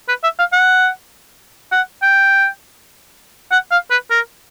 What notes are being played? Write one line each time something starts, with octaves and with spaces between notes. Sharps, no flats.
B4
E5
F5
F#5
F#5
G5
F#5
F5
B4
A#4